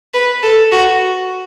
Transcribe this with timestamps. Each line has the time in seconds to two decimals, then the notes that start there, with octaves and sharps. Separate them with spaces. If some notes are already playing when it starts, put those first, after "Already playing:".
0.14 B4
0.43 A4
0.72 F#4